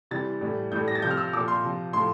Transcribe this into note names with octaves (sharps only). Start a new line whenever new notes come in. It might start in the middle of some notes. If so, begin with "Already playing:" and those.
C3 E3 G3 A6
A2 E3 G3
A2 E3 G3 G6
A#6
A6
C3 F3 G6
F6
E6
A#2 F3 D6
C6
C3 F3
A2 F3 C6